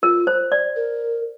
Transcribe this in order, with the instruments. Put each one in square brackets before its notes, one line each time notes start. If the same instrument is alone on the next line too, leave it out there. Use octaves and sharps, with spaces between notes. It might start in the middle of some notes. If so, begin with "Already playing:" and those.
[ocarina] F4 [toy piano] A#4
[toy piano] C5
D5
[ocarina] A#4